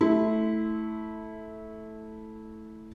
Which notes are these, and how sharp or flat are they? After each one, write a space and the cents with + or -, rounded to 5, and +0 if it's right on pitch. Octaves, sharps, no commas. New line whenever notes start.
A3 -5 E4 -15 C6 -35